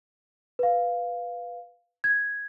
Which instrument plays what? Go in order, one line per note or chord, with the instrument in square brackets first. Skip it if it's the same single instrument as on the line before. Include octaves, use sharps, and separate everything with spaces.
[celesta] B4 F5
G#6